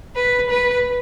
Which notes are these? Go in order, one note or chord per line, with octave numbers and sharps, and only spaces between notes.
B4
B4